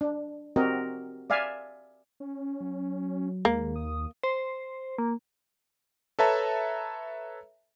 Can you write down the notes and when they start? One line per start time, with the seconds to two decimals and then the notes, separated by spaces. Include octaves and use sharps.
0.01 D4
0.56 C4 F#4 G4 A#4 D#5
1.30 D5 E5 F5 G#5
2.20 C#4
2.60 F#3
3.45 D#2 G#3 A#3
3.76 D#6
4.23 C5
4.98 A#3
6.19 A4 B4 C#5 E5 A5 A#5